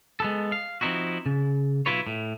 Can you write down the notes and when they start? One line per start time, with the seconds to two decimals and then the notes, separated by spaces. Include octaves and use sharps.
0.20 G#3 B3 A4
0.52 F5
0.81 F3 C4 C#4 D#4 E4 F#4
1.26 C#3
1.86 B1 E4 F4 B4 C#5
2.07 A2